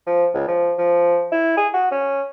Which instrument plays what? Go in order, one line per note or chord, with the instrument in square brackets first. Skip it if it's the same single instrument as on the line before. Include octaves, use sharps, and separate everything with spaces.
[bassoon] F3
C#2
F3
F3
E4
G#4
F#4
C#4